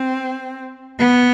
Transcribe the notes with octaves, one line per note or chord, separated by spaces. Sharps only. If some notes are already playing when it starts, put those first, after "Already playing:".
Already playing: C4
B3